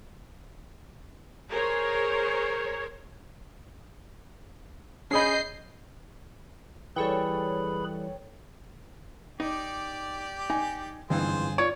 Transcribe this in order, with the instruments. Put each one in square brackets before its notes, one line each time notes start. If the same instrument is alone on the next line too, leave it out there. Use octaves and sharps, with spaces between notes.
[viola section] G#4 A#4 C5 C#5
[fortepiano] C#4 G#4 B5 [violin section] D#5 G6 C7
[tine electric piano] E3 G3 [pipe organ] G#4 B4 B5 [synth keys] A4 C#5 G5
[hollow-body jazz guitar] D#4 [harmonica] G4 D5
[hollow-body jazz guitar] D#4 [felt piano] G#5
[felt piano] G1 [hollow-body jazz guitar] F2 G#2 E3 [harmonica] F4 G#4 C5
[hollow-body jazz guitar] F4 D5 [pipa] C#5